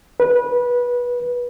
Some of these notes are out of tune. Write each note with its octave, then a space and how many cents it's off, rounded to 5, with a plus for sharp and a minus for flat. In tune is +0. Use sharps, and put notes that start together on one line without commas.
B4 -20